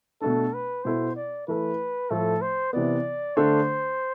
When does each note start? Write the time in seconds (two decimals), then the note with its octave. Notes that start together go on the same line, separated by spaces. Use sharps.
0.22 B2 A3 D4 A4
0.54 B4
0.84 B2 B3 E4 A4 C5
1.16 D5
1.48 E3 A3 E4 A4 B4
2.10 A2 F3 A3 E4 A4
2.42 C5
2.73 C3 E3 B3 D5
3.36 D3 A3 D4 A4 C5